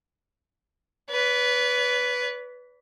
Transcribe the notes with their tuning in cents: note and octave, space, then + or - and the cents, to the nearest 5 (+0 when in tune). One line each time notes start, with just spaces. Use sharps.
B4 +0 D5 -45